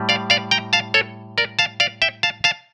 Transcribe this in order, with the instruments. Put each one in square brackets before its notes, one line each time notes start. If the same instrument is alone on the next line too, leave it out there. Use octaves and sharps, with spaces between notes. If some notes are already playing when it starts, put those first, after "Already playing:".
Already playing: [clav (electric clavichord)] A2 G3
D5 F5
D5 F5
G5 A#5
F5 A5
A4 C#5
A#4 D5
F5 A5
D5 F5
E5 G5
F5 A5
F5 A5